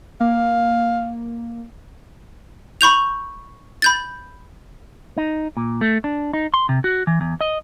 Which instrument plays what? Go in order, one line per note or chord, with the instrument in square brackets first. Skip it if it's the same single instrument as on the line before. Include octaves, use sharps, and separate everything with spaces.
[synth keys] A#3 [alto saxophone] F5
[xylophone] B5 C#6 G6 F7
B5 G6 A6
[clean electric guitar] D#4
A#2
A3
D4
D#4
C6
C3
F#4
E3
E2
D#5